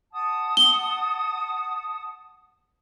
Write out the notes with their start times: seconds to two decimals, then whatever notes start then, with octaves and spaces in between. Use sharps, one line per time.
0.12 F#5 A5 D#6
0.57 G7